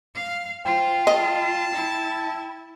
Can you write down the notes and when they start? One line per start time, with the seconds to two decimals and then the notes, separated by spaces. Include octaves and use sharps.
0.15 F5
0.65 F4 C5 G5
1.07 D#5 A5
1.73 E4